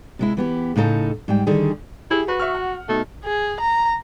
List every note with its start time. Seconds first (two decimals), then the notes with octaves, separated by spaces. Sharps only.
0.19 C3 G#3 E4
0.37 E3 B3 G4
0.76 A2 C#3 D#4 A4 A5
1.28 G#2 G3 G5
1.47 D3 D#3 G3 G#4
2.11 E4 G4 G#4
2.28 F#4 B4
2.40 E5 C#6 F6
2.55 F#5
2.89 B2 A3 D#4
3.25 G#4
3.60 A#5